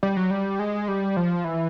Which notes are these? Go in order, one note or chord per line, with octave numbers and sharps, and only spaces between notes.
G3
F#3
G3
G#3
G3
F3
E3